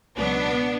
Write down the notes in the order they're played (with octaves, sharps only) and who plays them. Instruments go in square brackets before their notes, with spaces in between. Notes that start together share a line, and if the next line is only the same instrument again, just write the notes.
[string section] C#2 B2 F#3 B3 D4